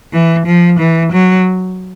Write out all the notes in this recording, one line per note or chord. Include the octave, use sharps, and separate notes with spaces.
E3
F3
E3
F#3